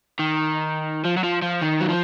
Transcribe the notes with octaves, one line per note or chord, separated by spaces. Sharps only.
D#3
F3
F#3
F3
F3
D#3
F#3
F3